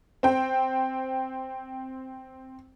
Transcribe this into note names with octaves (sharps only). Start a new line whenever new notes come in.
C4 G5